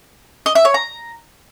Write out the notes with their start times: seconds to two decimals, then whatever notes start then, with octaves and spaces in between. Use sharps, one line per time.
0.46 D#5
0.55 E5
0.65 C#5
0.74 A#5